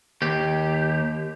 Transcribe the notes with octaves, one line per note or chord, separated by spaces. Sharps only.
D#2 G4